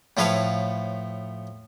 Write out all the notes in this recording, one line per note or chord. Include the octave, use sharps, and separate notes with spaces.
A2 F3 A4 B4 C#5 F5